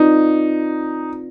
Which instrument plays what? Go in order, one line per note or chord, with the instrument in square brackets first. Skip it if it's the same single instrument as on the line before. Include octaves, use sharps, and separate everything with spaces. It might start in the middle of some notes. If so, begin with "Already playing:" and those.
Already playing: [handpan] C4 F4 B4 D5 [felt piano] D#4